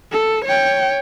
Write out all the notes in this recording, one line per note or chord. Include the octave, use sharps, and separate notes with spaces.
A4
C#5 G5